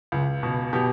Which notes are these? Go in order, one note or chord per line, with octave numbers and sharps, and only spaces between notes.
C#2
B2
B2 G4